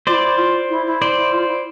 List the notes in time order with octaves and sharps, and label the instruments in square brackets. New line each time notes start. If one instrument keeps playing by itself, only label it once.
[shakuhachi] F4 [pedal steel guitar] C5 D5
[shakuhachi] E4
F4
E4
E4
[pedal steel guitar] C5 D5
[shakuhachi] E4
F4
E4